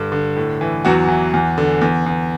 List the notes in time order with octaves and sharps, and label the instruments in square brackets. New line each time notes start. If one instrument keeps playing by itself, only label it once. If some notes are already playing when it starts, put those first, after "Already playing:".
Already playing: [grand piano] G2 D3
D3
A2
E3
E2 F#3 F#4
E3
E2
D3
E2
E2